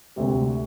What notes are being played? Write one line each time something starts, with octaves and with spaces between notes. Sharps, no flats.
D2 C3 G3